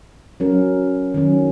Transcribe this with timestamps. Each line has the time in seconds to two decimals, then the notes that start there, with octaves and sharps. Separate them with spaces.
0.40 F#3 C#4 F#4 A#4
1.14 D#3 F#3 C#4